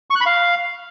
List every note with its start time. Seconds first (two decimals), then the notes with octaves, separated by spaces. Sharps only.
0.10 C#6
0.16 F#6
0.21 B5
0.26 F5